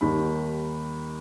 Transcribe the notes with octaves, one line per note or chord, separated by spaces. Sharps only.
D#2 D#3 G3 D#4 B5